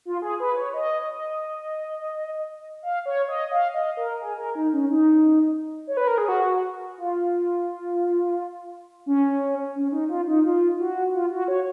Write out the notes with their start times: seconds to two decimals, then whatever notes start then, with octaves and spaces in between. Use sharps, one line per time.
0.05 F4
0.22 G#4
0.40 B4
0.56 C#5
0.74 D#5
1.09 D#5
2.83 F5
3.06 C#5
3.28 D#5
3.51 F5
3.74 D#5
3.97 A#4
4.21 G#4
4.38 A#4
4.55 D#4
4.73 C#4
4.91 D#4
5.87 C#5
5.97 B4
6.08 A#4
6.18 G#4
6.28 F#4
6.98 F4
9.06 C#4
9.76 C#4
9.92 D#4
10.09 F4
10.27 D#4
10.44 F4
10.79 F#4
11.13 F4
11.31 F#4
11.48 C#5